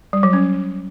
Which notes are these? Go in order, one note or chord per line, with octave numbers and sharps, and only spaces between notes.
G3
F#3
C#4